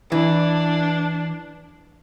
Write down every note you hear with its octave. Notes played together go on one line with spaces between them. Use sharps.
E3 D4